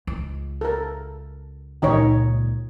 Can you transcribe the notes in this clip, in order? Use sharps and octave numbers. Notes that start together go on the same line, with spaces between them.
C#2
A4 A#4
C#2 A#2 D#3 D#4 C#5